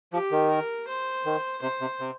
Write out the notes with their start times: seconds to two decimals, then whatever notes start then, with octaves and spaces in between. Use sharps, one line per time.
0.13 F3 G4
0.31 D#3
0.50 A#4
0.88 C5
1.25 D#3
1.62 C3 C5
1.81 C3
2.00 C3